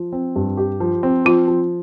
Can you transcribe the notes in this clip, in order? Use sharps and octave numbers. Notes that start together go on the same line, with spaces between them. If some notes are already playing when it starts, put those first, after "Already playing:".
Already playing: F3
C4
G2
G4
F3
C4
F3 F4
F3